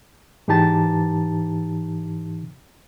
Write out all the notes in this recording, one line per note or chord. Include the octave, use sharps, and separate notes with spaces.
G#2 E3 D#4 G4 A5 A6